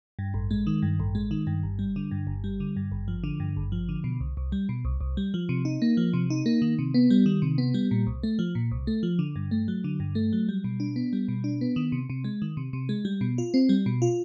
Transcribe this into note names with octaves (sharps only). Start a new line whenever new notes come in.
G2
A1
G#3
D#3
G2
A1
G#3
D#3
G2
G1
G3
D3
G2
G1
G3
D3
G2
G#1
F3
D3
G2
G#1
F3
D3
B2
C2
C2
G3
B2
C2
C2
G3
F3
C3
D#4
A#3
F3
C3
D#4
A#3
D#3
C3
B3
G3
D#3
C3
B3
G3
A#2
C2
A3
F3
A#2
C2
A3
F3
D3
G2
A3
F#3
D3
G2
A3
F#3
G3
B2
D4
B3
G3
B2
D4
B3
D#3
C3
C3
G#3
D#3
C3
C3
G#3
G3
B2
F4
C4
G3
B2
F4